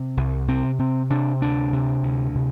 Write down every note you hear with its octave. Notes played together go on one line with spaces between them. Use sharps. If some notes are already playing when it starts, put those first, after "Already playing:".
Already playing: C3
C2
C3 C4
C3 C4
C3 D4
D2 D4
C3
D2
C3